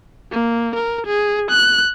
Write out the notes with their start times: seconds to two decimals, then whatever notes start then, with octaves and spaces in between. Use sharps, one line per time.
0.32 A#3
0.76 A#4
1.06 G#4
1.51 F#6